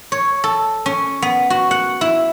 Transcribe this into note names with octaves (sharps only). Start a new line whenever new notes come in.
C#5
A4
C#4
B3
F#4
F#5
E4